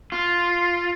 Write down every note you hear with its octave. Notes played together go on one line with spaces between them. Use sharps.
F4